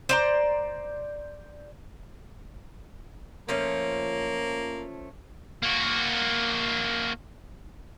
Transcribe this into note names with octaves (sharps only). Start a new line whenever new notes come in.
C5 D5 A#5
F3 A3 A#3 C#4
A#3 F#4